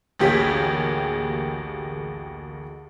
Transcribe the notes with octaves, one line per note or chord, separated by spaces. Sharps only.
A1 D2 A#3 G4 G#4 B6